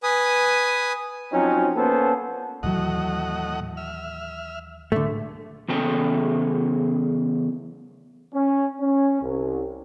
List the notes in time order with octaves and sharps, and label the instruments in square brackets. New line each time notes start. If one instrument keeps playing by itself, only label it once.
[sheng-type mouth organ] B4 G#5 D#6
[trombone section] F3 F#3 C4 C#4 D#4
A#3 B3 C#4 A4 C5
[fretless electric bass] D#2 E3 F#3 [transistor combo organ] A2 D#5 F#5
[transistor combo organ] E5 F6
[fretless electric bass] A2 [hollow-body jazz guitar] D3 A3
[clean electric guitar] E2 C#3 A4 G5
[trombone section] C#4
C#4
C2